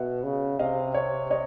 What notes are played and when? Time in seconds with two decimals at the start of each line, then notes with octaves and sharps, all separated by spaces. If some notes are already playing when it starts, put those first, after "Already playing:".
Already playing: B2 E5 F#5
0.24 C#3
0.59 C3 D#5 F5
0.94 C#5
1.31 C#5 D#5